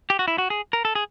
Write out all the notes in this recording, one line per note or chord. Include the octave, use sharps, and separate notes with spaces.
G4
F#4
E4
F#4
G#4
A#4
A4
G#4